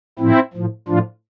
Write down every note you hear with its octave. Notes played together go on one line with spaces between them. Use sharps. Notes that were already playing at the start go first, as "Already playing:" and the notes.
A2 F3 C4 E4
A2 F3
A2 F3 D4 F4